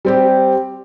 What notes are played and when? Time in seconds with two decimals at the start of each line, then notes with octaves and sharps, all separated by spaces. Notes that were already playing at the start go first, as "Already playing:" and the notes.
0.05 G3 C4 G4